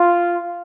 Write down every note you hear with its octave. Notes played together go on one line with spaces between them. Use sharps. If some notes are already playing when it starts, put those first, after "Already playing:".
Already playing: F4